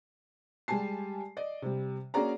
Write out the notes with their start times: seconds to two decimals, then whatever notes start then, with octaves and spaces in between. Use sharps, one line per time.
0.68 G3 G#3 G4 G#5 A5 C7
1.37 D5 D#5
1.62 C3 G3
2.14 A#3 C#4 F#4 G#4 D5 A#5